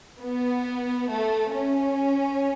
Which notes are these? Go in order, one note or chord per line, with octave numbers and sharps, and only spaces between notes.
B3
A3
C#4